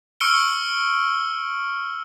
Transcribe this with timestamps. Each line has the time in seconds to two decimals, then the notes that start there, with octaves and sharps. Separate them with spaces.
0.20 C#6 E6 F6 C#7 D7 G7